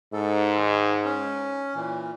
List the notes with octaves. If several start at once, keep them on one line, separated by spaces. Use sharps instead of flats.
G#2 A4
D#3 D#4
C#4
A#2 E3